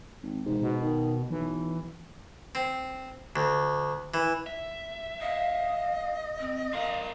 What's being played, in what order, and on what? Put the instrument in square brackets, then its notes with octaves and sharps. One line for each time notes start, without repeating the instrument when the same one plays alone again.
[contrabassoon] G#1
[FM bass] E1 [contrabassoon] G#2
[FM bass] B2
[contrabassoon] D#3
[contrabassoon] B1 [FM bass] E3
[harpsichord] C4
D2
E3
[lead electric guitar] E5
[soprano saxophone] D#5 [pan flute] F5
[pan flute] C4
[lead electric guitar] C4 A#4 [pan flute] F5